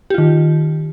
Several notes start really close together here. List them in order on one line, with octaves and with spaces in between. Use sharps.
G4 F4 D#3